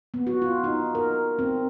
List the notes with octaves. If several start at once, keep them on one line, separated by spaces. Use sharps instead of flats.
B3
F#4
F4
D#4
A#4
C4